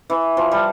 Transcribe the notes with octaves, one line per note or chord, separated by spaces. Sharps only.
E3
F3
G3